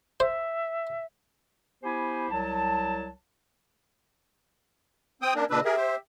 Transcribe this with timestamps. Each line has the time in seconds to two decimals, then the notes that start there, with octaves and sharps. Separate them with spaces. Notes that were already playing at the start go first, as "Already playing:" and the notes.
0.20 C5 E5
1.83 B3 E4 G4 C5 G#5
2.31 C2 F#3 A5
5.22 C4 G5 D#6
5.36 A#3 C#4 D4 A#4
5.50 A#2 C#3 D4 B4 D#5 E6
5.65 G4 G#4 A#4 E5
5.77 C5